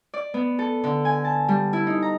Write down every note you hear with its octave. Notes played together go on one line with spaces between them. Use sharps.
D5
B3
A4
D3
G#5
A5
G3
E4
D#4
A#5